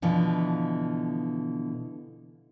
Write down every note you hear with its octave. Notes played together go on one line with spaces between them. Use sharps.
B2 D3 E3 F3